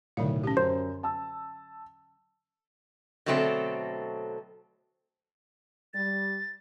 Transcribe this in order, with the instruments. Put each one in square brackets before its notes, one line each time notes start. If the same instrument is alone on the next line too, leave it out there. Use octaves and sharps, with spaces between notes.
[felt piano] B1 A2 [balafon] D3 F#3 F5
[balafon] C#4 G4
[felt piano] F#2 [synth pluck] C5
[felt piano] A5 E6
[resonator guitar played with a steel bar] B2 D3 F#3 A3 C4 A4
[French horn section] G3 [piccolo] A6